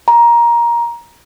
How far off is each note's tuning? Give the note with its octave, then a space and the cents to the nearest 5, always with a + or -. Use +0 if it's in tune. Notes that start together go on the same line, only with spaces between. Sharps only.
A#5 +15